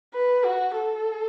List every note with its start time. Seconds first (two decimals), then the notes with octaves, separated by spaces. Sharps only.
0.14 B4
0.45 F#4
0.76 A4